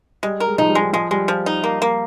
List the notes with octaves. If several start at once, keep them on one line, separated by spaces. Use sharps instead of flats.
G3 G#3
A#4
G#3
F3 D#4
G3
G#3
G3
F3 G#3
G3 G#3
F3
D#4
A#3
A#3